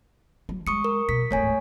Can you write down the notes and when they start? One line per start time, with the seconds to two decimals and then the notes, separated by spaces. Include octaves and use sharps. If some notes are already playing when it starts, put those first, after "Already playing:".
0.49 F#3
0.67 G#3 C#6 D#6 C#7
0.85 A#4
1.09 B2 B6
1.31 D1 G#1 A3 C#5 G#5